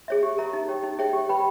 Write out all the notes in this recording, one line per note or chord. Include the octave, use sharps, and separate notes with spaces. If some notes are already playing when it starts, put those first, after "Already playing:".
G#4 C#5 E5
G4
A#4 E5 A#5
D#4
G4 C#5 G5
D#4
G#4 C#5 E5 G5
G4
B4 G5 B5